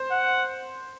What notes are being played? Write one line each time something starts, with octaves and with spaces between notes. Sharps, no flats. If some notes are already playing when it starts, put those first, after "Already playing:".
Already playing: C5
F#5